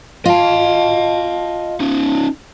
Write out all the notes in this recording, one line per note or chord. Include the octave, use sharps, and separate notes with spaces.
F4 D#5 A5
C#4 D#4